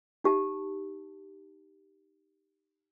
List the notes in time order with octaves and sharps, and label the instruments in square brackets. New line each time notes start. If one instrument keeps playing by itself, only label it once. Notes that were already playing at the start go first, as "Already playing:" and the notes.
[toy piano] D#4 G4 A5